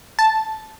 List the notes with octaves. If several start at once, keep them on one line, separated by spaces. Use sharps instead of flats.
A5